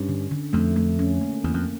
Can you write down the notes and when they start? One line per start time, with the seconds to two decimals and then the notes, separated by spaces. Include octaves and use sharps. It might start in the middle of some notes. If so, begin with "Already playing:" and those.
Already playing: G2 C#4
0.09 D3
0.31 D3
0.53 F2 A3
0.76 A3
0.99 C#4
1.21 A#3
1.44 E2 A#3
1.54 F2